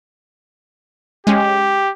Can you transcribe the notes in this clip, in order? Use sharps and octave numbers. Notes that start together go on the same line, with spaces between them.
G#3 C#4 G4